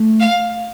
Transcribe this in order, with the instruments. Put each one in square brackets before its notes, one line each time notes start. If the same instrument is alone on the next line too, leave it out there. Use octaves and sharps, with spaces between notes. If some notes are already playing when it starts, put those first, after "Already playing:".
Already playing: [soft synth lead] A3
[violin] F5